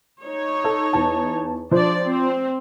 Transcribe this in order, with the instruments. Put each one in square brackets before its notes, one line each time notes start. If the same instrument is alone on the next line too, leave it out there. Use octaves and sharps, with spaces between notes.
[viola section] D#4 C#5
[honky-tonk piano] A4
E2 A5
[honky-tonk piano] F3 C5 [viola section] D4 D5
[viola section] C4